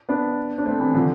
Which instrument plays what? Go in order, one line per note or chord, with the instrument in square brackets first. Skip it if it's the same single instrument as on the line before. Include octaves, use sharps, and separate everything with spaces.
[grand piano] B3 D4
D4
A3 C4
C3 E3
D3 F3